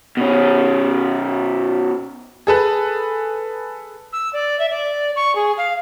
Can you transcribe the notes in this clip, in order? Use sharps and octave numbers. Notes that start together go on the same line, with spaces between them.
B2 C#4
G#4 A4 B4
E6
D5
E5
D5
C#6
G#4
F5